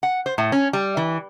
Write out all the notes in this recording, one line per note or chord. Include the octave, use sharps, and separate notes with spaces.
F#5
C5
A2
C#4
G3
E3